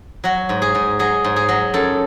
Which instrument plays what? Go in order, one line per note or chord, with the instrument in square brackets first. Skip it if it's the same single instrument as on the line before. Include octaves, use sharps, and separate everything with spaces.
[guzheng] F#3 F#4
G#2
G#4
G#2
F#3 G#4
G#2
G#4
F#3
F#2 A4